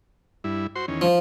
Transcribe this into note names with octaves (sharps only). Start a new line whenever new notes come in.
G2 E4
F#4 C5 C6
E2 D#3 C#4
F3